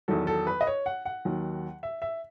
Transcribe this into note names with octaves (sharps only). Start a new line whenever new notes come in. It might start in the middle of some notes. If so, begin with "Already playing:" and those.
E2 D#3 F#3 A4
A4
B4
D#5
C#5
F#5
F#5
D#2 D#3 F#3
E5
E5